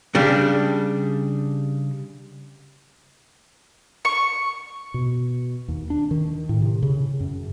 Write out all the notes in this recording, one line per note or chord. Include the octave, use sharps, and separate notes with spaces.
C#3 G3 D4
C#6
B2
D#2
D4
D#3
A2
C3
C#3
F#2